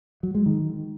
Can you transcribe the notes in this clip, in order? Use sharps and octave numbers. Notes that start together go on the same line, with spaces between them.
F#3
G#3
D#3